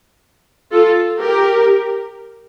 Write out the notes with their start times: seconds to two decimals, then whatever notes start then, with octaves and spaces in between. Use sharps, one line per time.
0.72 F4 A4
1.20 G4 A#4